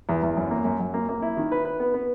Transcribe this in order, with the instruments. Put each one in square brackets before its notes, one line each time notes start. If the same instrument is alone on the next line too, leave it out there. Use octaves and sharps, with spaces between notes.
[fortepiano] E2
E2
F#2
A#3
F#2
F#2
A#3
A#3
E4
D#3
B4
B4
B3
B3